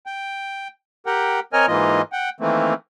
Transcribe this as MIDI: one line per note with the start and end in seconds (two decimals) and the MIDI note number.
0.06 0.68 79
1.06 1.40 67
1.06 1.40 70
1.06 1.40 78
1.06 1.40 79
1.53 1.66 60
1.53 1.66 70
1.53 1.66 73
1.53 1.66 75
1.53 1.66 80
1.53 1.66 89
1.68 2.02 44
1.68 2.02 52
1.68 2.02 58
1.68 2.02 65
1.68 2.02 75
2.12 2.29 78
2.12 2.29 79
2.40 2.74 51
2.40 2.74 52
2.40 2.74 57
2.40 2.74 58
2.40 2.74 60